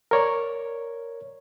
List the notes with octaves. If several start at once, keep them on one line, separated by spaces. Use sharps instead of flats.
A#4 C#5 D5